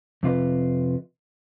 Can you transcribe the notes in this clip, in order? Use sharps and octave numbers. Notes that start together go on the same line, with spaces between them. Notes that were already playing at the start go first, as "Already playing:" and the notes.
F2 C3 F4 B4 D#5